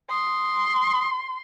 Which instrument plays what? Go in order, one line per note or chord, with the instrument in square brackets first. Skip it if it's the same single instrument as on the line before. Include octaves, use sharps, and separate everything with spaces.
[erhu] C6 [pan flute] D#6